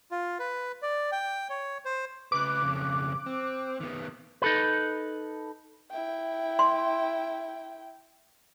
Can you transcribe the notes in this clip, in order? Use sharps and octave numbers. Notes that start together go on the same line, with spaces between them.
F4
B4
D5
G5
C#5
C5
C#3 B4 D6 F#6
F2 C#3
C4
D#3 B3
D#4 A4 B4
E4 G5
C6